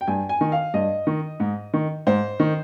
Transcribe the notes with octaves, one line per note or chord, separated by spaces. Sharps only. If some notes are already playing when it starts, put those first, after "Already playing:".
G5
G2 G#5
G#5
D#3
F5
G2 D#5
D#3
G#2
D#3
G#2 C5
D#3